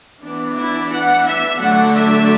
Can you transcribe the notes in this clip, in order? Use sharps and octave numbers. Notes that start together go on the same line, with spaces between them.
E3 B3 D4
E4
F#5
E5
D3 F#3 A3 D4 F#5
E5